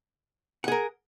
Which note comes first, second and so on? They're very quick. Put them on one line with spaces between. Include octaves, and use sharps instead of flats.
F#5 G#4 A#4